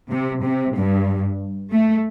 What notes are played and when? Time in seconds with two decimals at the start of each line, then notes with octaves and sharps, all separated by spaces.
0.10 C3
0.44 C3
0.76 G2
1.71 A3